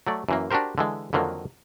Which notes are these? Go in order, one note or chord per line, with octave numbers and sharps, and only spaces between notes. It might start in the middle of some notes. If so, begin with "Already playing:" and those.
F#3 A3 D5
F#2 E3 A#3
D4 F#4 G4 A#4 C5
D3 E3 G#3
F2 D3 D#3 F#3 A#3